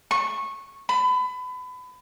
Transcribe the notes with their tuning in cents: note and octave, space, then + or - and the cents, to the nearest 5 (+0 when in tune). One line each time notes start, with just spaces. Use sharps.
C#6 -15
B5 +30